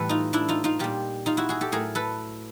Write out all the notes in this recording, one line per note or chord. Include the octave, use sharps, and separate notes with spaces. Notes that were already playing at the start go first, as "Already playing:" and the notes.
Already playing: A2 E3 G3 A4 B4
D#4 F4
D4 E4
D#4 F4
D#4 F4
A#2 G3 F4 G4
D#4 F4
E4 F#4
F#4 G#4
G4 A4
A2 F#3 A3 G#4 A#4
A4 B4